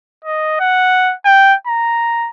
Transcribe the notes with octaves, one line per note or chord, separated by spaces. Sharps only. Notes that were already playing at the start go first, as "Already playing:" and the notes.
D#5
F#5
G5
A#5